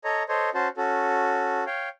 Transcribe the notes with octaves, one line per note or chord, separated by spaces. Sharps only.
A4 C#5 D#5 A#5
A4 C5 C#5 D#5
C#4 F#4 C5 A5
C#4 F#4 A4
C#5 F5 G5